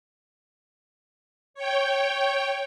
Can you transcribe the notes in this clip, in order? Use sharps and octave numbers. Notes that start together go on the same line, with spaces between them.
C#5 G5